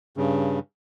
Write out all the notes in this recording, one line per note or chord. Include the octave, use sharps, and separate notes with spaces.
G2 C#3